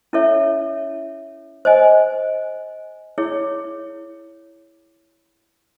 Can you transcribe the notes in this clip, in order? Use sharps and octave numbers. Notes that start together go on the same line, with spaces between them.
C#4 E4 A4 C#5 E5
C5 D#5 G#5
E4 G#4 C#5